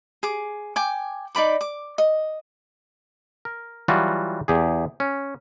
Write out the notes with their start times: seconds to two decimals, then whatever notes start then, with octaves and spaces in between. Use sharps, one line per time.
0.23 G#4 D6
0.76 G5 G#5 D6
1.35 D#4 D5 B5 D6
1.61 D6
1.98 D#5
3.45 A#4
3.88 E3 F#3 G3 F4 F#4
4.48 E2 G4 G#4
5.00 C#4